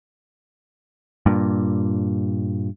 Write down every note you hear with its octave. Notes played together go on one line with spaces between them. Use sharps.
G2 A#2